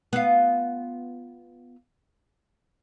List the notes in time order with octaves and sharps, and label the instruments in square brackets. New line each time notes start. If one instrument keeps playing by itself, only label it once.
[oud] B3 F4